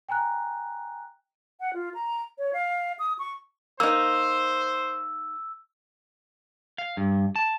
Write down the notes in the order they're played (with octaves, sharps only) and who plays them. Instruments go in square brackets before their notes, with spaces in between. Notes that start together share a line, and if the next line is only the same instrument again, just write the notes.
[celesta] G5 G#5 A#5 F#6
[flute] F#5
F4
A#5
C#5
F5
D#6
C#6
[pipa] A#3 D#4 [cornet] C5 [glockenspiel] E6
[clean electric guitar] F5
G2
A5